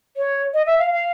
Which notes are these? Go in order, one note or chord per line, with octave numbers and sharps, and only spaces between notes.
C#5
D#5
E5
F5
F5